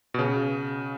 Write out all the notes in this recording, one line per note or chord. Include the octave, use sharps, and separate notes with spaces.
B2
C#3